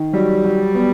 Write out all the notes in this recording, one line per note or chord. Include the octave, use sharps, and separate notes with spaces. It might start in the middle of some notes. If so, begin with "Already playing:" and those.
Already playing: D#3
F#3 G3
F#3
B3